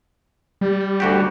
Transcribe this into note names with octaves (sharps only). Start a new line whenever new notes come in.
G3
D2 F#4 G4